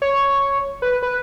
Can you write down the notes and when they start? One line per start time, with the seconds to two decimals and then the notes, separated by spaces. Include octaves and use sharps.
0.02 C#5
0.82 B4
1.02 B4